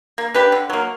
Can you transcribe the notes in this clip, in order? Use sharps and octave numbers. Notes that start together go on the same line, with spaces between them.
A#3
D4 G4 B4
D3
F#3 A#3